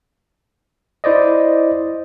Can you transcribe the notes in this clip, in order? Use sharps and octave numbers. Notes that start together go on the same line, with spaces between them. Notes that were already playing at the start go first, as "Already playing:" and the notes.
E4 C5 D5 D#5